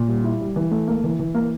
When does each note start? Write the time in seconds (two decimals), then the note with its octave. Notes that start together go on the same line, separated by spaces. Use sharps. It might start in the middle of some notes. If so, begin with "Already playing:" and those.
Already playing: A#2
0.08 G3
0.24 E4
0.41 G3
0.56 E3
0.71 A3
0.88 A#3
1.04 E3
1.19 E3
1.35 A#3